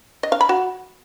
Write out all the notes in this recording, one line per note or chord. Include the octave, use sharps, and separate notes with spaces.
D#5
F5
B5
F#4